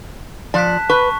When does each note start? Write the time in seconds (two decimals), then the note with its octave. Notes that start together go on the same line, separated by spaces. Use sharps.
0.54 F3 D5 A5 F#6 B6
0.90 B4 C#6